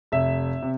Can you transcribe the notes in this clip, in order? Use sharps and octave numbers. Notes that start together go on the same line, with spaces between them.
F1 E5
C3